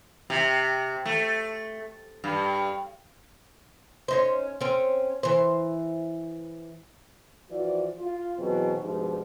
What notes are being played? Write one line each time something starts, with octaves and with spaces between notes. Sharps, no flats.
C3
A3
G2
C#4 D#4 C5
C4 C#4
E3 C5
E3 F3 F#4 D5
F4
B2 E3 F#3 C4 G#4
G2 B2 F3 G#3 D#4